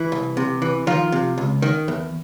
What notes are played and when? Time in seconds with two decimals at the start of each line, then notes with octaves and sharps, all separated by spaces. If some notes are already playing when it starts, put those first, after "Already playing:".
Already playing: E3 E4
0.12 C2
0.37 C3
0.62 E3
0.87 D#3 F3 F4
1.12 C3
1.38 C#2
1.62 D#3
1.88 E2